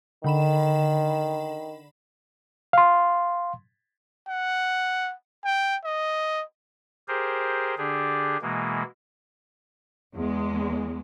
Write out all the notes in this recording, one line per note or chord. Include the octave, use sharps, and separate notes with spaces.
D3 D#3 B5 E7
F5 C6
F#5
G5
D#5
G4 G#4 A#4 C5
D3 D4 G4 G#4
B2 E3 G#3 A#3
E2 G#3